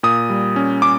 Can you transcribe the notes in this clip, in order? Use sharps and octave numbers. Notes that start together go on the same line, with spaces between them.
A#2 D#6
G3
C#4
C#4 D6